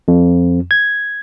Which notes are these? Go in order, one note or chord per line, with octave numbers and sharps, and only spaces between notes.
F2
G#6